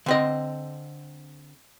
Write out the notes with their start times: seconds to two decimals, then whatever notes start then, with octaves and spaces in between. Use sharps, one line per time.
0.06 D3 C4 D#5